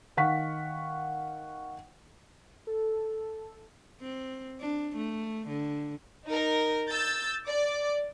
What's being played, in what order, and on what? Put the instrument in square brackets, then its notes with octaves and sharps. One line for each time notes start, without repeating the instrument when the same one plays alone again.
[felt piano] D#3 F5 F#5 C#6 B6
[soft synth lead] A4
[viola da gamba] C4
D4
A3
D3
[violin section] D#4 A#4
E6 G6 A6
D5 D6